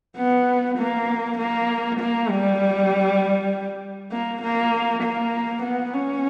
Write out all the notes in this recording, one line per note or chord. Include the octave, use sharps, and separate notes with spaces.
B3
A#3
A#3
A#3
G3
A#3
A#3
A#3
B3
C#4